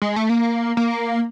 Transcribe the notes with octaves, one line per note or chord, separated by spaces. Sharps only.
G#3
A3
A#3
A#3